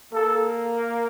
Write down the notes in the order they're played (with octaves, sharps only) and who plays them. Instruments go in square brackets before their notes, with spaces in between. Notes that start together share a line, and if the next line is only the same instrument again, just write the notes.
[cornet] A#3 [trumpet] A4